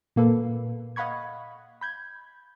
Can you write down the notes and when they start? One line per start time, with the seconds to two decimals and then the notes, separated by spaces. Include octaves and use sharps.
0.16 A#2 A#3 A4 B4
0.96 D#5 F5 F#5 B5 C#6 G#6
1.81 B5 G6 G#6